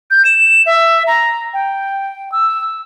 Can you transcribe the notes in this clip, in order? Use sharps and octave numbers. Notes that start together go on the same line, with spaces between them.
G6
E7
E5
A#5
G5
E6